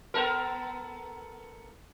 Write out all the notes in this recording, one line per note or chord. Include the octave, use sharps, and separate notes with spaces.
B3 A4 A#4